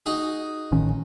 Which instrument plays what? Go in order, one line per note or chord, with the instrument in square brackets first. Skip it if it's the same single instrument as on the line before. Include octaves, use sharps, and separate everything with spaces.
[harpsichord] D#4 F#4 G#4
[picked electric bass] A1 D#3 C#4